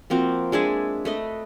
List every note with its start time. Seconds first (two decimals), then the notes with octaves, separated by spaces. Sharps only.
0.10 F3 A#3 C4 F#4
0.52 G#3 D4 G#4 E5
1.05 A3 B4 D#5